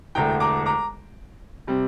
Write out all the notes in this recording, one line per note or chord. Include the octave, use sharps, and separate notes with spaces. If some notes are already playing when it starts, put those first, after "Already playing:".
E1 D2 D3 A3 G5 A#5
A#5 D6
A#5 D6
C3 G3 C4